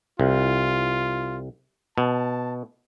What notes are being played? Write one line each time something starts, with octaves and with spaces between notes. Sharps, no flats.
C2 F4
B2 A5